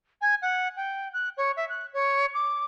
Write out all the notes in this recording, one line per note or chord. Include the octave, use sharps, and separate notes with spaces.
G#5
F#5
G5
F#6
C#5
E5
F#6
C#5
D6